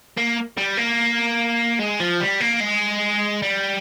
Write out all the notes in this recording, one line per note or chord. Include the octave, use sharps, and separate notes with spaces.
A#3
G3
A#3
G#3
F3
G3
A#3
G#3
G3